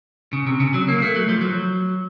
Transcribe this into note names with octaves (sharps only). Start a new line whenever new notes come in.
C#3
C3
C#3
F#3
A#3
A3
F#3
F3
F#3